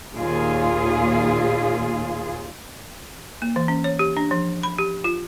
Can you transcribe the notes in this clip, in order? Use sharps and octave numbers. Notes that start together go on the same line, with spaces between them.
D#2 A#2 F4 G#4
A#3
E3
C#4
C#5
G4
D4
F3
B5
G4
F4